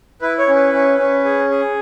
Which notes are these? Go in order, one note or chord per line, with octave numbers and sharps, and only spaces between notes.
E4 B4
C#5
C#4
B4
C#4
C#4
G#4
G#4